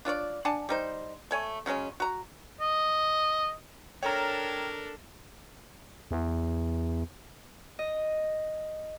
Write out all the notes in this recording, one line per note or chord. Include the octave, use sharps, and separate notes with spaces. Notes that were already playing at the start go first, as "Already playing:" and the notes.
D4 F4 C#5 D5
D4 F#5 G#5 A5
G3 D#4 C5
A3 C#5 G#5
C#3 F#3 G#3 C#4
F#4 A#5
D#5
D4 A4 A#4 C#5 G5 A#5 F6
E2
D#5